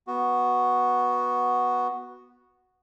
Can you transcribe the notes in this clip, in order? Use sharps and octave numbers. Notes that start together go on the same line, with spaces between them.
B3 F#4